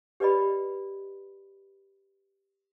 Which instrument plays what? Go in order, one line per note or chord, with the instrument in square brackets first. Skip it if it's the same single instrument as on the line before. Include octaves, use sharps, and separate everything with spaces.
[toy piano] G4 B4 D5 D#5 B5